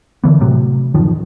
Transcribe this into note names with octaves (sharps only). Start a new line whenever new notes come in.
D3 E3 B3
A2 C3 F#3
D1 F#2 D#3 F3